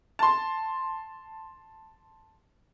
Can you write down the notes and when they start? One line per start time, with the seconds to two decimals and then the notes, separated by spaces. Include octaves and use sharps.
0.19 A5 C6